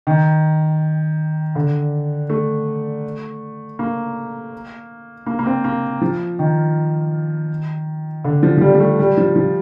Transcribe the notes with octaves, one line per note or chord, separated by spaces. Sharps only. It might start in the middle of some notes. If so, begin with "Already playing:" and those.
D#3
D3
A3
A#3
A#3
A#3
C4
A#3
F3
D#3
D3
F3
F3
G3
G3
A3
G3
F3
F3